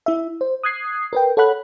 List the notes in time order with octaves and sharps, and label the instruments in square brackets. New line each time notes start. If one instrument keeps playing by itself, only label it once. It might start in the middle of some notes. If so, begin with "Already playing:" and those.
[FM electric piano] E4 E5
C5
D#6 F#6 G#6 C7
A#4 B4 G5
A4 C#5 F#5 B5 F#6